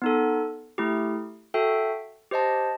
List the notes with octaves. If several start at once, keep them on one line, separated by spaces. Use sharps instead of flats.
B3 D#4 A4
A3 E4 G4
F#4 A4 E5 G5
G4 C5 D#5 A5